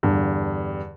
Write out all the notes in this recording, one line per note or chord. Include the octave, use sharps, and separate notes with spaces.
E2 G2 D3